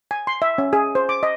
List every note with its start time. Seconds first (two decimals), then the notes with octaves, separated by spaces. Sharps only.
0.11 G#5
0.27 C6
0.42 E5
0.58 C#4
0.73 G#4
0.95 C5
1.09 D6
1.23 D#5